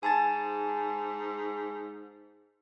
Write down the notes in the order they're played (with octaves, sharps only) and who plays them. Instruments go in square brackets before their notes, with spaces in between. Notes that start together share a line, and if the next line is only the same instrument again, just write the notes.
[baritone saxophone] G#2 [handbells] G#5 A5 A6